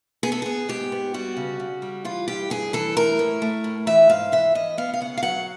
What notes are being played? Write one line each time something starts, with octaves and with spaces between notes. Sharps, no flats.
B3 G#4
A4
B3 G#4
G#2 G4
B3
G3 F#4
C#3
C#3
G3
E3 F4
G2 G4
G2 G#4
E3 A4
A3 A#4
A2
A3
A2
E3 E5
G#2 F5
E3 E5
E3 D#5
B3 F5
F5
C#3 F#5
F5
F#3 F#5